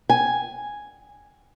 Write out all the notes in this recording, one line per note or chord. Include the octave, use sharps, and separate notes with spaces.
G#5